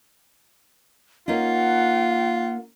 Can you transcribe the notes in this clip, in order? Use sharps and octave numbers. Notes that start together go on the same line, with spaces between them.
A#3 C#4 D#4 F4 F#5